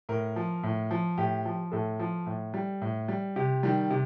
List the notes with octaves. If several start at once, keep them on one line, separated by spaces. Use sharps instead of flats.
A2 A#4
F3
A2
F3
A2 G4
F3
A2 A4
F3
A2
G3
A2
G3
C3 G4
D#3 G3
C3